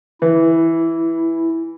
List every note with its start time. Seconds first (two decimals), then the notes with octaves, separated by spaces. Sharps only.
0.22 E3 E4